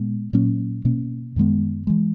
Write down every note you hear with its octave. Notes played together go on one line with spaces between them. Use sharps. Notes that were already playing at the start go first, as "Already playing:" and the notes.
Already playing: A#2 G#3 B3
A#2 F#3 A#3 C#4
B2 A#3 C#4
F#2 D#3 G#3 B3
E3 G#3